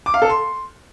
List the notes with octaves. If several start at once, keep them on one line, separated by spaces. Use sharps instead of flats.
D6
F5
A4
C6